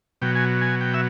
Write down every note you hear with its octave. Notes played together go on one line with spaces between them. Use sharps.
B2 F#3 G5
G#5
G#5
G5
E5